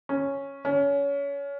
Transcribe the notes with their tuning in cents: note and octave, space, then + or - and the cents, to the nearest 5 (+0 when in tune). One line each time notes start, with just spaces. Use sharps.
C#4 -5
C#4 +25